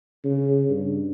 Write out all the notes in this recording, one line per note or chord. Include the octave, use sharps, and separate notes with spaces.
C#3
G2